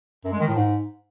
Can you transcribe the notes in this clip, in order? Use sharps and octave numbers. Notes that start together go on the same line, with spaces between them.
F#2
G#3
D#3
A2
G#2